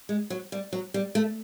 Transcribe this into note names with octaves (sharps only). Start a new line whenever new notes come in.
G#3
F#3
G3
F#3
G3
A3